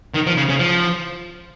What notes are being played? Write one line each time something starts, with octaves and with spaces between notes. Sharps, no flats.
D#3
F3
C#3
C#3
F3